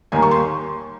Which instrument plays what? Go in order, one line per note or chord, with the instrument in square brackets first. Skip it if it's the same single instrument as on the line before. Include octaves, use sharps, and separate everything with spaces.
[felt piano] D#2 D#3 G3 A#3 G#5
C#6
C6